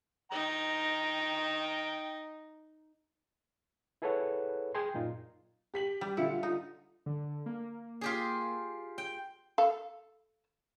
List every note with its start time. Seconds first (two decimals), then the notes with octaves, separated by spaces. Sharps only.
0.32 D#4 G5 A#5
4.02 E4 G#4 A4 B4 C#5 F#5
4.75 G#4 G5 G#5 C6
4.94 F#2 A#2 D#4 F4
5.74 G4 B6 F#7
6.01 G3
6.17 D3 E4 F4 C#7
6.43 D#4
7.06 D3
7.46 A#3
8.01 F4 G4 G#4
8.98 G5
9.58 A4 F5